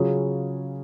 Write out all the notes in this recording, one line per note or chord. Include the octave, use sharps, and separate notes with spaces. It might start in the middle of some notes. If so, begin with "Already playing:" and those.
Already playing: C#3 F#3 C#4 F4 G#4